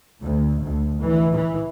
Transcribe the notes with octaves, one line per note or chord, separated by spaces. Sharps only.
D2
D2
E3
E3